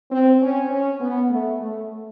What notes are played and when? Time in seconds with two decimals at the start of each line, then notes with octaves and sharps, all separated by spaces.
0.12 C4
0.42 C#4
0.72 C#4
1.01 B3
1.31 A3
1.60 A3